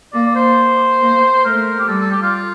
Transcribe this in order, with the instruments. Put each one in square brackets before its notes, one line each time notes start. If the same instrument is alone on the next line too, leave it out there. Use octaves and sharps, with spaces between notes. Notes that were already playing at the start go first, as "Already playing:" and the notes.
[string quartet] A#3 [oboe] D5
[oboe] D5
C5
[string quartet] A#3
[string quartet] A3 [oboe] A#4
[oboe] G4
[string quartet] G3 [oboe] A4
[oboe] A4
G4
F4